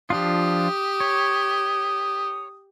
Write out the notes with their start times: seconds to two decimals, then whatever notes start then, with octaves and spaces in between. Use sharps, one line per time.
0.10 F3 D4 F4 G4 D#6
1.00 C#5